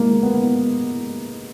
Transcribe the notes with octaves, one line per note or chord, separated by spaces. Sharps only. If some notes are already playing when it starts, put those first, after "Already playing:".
Already playing: G#3 A#3
B3